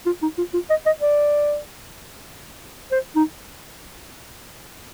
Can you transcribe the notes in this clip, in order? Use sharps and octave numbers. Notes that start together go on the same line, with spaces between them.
F4
D#4
F4
F4
D#5
D#5
D5
C5
D#4